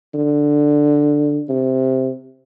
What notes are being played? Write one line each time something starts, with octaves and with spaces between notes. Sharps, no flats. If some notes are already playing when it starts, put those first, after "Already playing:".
D3
C3